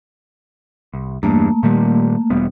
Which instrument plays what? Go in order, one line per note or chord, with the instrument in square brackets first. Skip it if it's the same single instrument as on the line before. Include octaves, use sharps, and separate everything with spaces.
[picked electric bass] C2
[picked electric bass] E2 G2 [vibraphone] A3 A#3
[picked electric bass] A#2 D#3 G3
E1 G3 B3